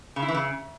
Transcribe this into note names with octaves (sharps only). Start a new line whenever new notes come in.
C#3
E4
E3
C#3